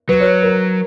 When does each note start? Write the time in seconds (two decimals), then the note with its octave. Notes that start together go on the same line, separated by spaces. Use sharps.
0.09 F#3 B4
0.20 C#5
0.43 A#4